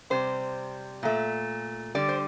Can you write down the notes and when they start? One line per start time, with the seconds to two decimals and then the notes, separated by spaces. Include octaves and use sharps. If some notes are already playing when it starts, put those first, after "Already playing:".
0.10 C3 G3 C5
1.03 A#2 A3
1.95 D3 G3 D5
2.09 C5